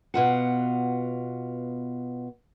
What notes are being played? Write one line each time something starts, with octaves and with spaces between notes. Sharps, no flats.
B2 F4 F#5